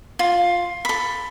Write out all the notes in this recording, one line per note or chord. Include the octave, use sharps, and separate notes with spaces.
F4
A4 B5